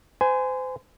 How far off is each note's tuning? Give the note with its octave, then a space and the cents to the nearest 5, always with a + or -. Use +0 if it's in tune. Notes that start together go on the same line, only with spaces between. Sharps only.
C5 -35 G#5 +0